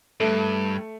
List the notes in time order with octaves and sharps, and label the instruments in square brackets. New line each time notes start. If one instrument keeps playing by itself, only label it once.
[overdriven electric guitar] G2 [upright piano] A3